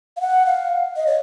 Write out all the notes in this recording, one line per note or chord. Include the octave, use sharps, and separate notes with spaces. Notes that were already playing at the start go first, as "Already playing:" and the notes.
F5
F#5
F5
D#5
C#5